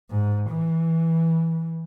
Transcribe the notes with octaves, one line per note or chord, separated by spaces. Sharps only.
G#2
E3